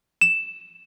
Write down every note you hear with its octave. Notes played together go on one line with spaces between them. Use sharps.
E7